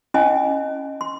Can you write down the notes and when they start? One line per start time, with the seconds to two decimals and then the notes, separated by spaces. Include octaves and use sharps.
0.14 C#4 E4 D#5 G#5 A5
1.01 C6